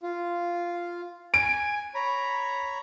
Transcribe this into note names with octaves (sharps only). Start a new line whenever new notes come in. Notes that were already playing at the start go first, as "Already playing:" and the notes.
F4
G#5 D7
C#5 A#5 B5